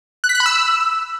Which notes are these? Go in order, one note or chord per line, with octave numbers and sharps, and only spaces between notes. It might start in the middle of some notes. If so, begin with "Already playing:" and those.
F#6
B6
F#6
B5
E6